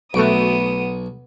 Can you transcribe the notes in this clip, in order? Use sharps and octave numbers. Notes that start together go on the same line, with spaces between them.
B1 A3 B3 F#4 D#6 D7